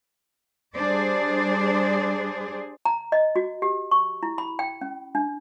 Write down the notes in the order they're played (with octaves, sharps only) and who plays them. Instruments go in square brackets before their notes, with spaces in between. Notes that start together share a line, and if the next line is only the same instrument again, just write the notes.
[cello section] G3 D4 G#4 C5 D5
[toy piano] A#5
D#5
F#4
G4
C#6
E4
B5
G5
C#4
D4